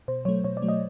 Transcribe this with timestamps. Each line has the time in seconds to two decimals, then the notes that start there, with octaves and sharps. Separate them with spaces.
0.08 B2 C5
0.25 F#3 A3 C#5
0.44 B2 C#5
0.57 D5
0.62 F#3 A3
0.68 D#5